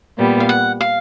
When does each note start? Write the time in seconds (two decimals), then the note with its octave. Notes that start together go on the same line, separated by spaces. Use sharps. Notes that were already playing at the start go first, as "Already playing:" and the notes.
0.18 A#2 G3 B3
0.40 F5
0.49 F#5
0.81 F5